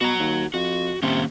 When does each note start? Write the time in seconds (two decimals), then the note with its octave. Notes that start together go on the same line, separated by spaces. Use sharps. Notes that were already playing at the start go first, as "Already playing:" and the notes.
0.01 B2 F#4 A#5
0.19 D#2
0.54 F2 F#4
1.03 C3 D#3 A#3 C#4